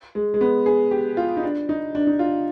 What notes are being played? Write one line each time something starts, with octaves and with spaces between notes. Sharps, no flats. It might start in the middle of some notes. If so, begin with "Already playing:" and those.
G#3
G#3
B3
G#4
G4
F4
D#4
D4
D#4
D4
D#4
F4